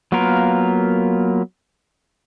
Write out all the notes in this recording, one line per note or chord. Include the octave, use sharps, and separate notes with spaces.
F#3 A#3 B3 F4 A#4